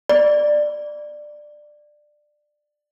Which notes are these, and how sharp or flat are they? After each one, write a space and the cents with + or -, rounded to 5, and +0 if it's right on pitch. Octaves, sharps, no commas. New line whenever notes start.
D5 +15